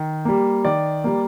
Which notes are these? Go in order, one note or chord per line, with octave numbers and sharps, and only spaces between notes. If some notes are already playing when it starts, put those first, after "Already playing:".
Already playing: D#3
G3 A#3
D#3 D5
G3 A#3